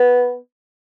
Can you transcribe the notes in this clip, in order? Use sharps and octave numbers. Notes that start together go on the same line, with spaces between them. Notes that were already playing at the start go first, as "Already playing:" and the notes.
Already playing: B3